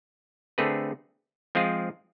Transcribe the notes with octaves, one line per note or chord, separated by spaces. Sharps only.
D3 A3 C4 G#4 B4
F3 G#3 C4 F4 G#4